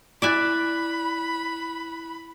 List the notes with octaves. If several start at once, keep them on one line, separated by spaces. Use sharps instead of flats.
E4 D5 E5 G#5 B5 F#6